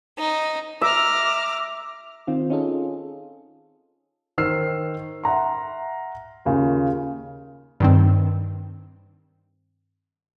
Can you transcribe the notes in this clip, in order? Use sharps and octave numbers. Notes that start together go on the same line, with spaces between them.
D#4
E5 A#5 D6 F6
D#3 C4 F4
C#4 D#4 F4 G#4 A4
D#3 C5 E6 F6 C7
E5 F#5 A#5 C6
D#2 C#3 F4
G2 D#3 C4